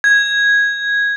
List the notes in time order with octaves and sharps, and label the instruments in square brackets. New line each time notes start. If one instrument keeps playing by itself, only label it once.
[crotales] G#6